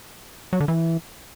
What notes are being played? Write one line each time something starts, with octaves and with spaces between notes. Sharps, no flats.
F#3
D3
E3